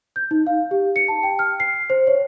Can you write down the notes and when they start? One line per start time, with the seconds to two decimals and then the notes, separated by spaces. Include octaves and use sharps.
0.16 G6
0.31 D#4
0.47 F5
0.71 G4
0.96 C#7
1.08 A5
1.23 G5
1.39 F6
1.60 C7
1.90 C5
2.07 C#5